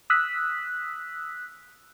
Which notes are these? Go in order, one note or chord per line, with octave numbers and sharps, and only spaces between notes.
D#6 E6 F#6 B6